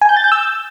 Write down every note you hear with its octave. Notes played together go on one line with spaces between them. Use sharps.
G#5
G6
A6
G6
E6